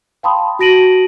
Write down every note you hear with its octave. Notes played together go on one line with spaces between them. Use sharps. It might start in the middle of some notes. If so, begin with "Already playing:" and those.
F5 G5 A5 B5 C6 D#6
F#4 A5 A#6 D7 D#7 F#7